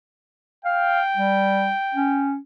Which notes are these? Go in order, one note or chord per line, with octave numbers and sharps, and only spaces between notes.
F5 G5
G3
C#4